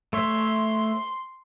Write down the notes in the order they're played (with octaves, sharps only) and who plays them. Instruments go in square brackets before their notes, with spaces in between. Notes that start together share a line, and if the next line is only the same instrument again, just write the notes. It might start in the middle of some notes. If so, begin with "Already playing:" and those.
[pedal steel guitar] A3 C#5 E5 [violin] C6